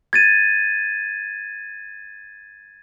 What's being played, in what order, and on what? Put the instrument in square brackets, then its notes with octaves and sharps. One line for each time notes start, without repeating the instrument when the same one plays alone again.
[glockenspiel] G#6 A6 D#7